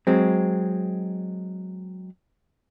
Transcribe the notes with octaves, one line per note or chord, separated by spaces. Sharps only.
F#3 G#3 C4